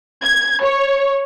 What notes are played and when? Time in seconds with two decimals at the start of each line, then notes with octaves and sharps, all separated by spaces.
0.22 G#6
0.63 C#5